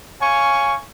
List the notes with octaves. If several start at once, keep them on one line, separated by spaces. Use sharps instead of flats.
C#5 F5 G#5 C#6